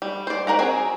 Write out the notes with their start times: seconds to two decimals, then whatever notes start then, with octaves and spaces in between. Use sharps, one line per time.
0.02 G3
0.27 C5 D5
0.47 G3 A#4 F#5 A#5
0.59 C4 F#4 G#4